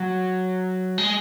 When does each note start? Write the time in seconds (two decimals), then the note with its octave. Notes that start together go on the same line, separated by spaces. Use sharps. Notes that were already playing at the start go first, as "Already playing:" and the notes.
Already playing: F#3
0.98 G#3